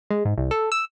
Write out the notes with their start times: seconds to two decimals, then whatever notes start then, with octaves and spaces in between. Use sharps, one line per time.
0.10 G#3
0.25 G#2
0.38 C2
0.51 A4
0.72 E6